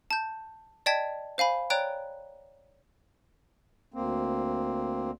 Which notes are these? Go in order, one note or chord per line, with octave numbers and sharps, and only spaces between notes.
A5 G6
D5 D#5 G5 A5 G#6 B6
C5 F5 G#5 B5
C#5 D5 G5 A#5 F#6 D7
D2 A#3 C4